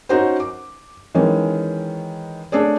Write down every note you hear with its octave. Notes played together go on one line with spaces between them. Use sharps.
C#4 D#4 F#4 C5
D6
D#3 E3 G#3 C#4
A3 D4 G#4 C#5 D5